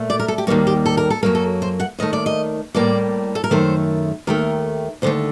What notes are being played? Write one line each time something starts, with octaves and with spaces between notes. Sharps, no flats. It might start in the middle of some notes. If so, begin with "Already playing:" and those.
Already playing: A#2 A3
D5
A#4
A4
G4
D#2 D#3 G3 A#3 F#4
G4
A4
A#4
A4
F#2 F#3 A#3 A#4
A4
C5
F#5
D#2 D#3 A3 D#5
D5
D#5
A2 G3 A#3 D5
A4
A#4
F#2 D#3 A3 C5
D#2 D#3 A3 A#4
D#2 D3 A3 C5